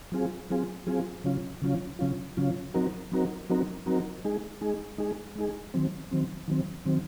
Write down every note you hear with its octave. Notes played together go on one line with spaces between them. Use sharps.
F#3 C4 F4 G#4
F#3 C4 F4 G#4
F#3 C4 F4 G#4
C#3 F#3 C#4 F4
C#3 F#3 C#4 F4
C#3 F#3 C#4 F4
C#3 F#3 C#4 F4
F#3 C4 D#4 F#4 A#4
F#3 C4 D#4 F#4 A#4
F#3 C4 D#4 F#4 A#4
F#3 C4 D#4 F#4 A#4
G#3 D#4 G#4
G#3 D#4 G#4
G#3 D#4 G#4
G#3 D#4 G#4
D#3 F#3 C4
D#3 F#3 C4
D#3 F#3 C4
D#3 F#3 C4